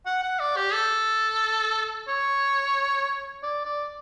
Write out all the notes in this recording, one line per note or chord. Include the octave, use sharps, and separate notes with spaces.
F#5
F#5
D5
G4
A4
C#5
D5
D5